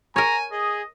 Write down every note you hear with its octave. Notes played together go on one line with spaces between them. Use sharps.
A#4 C#5 G#5 A#5
G#4 D#5